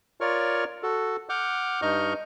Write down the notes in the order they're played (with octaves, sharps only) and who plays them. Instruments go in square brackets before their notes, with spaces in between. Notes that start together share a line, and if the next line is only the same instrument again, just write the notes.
[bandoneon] F4 A#4 C#5 D5 C#6 F6
F#4 A4
F#5 D6 F6 G6
G2 D#4 D#5 C#6 F6 G6